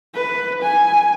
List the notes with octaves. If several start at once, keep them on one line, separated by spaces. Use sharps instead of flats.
B4
G#5